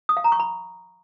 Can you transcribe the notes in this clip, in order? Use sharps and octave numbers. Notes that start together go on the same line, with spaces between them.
D#6
F5
A#5
C#6
B5